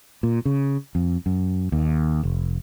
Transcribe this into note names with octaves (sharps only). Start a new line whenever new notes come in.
A#2
C#3
F2
F#2
D#2
F1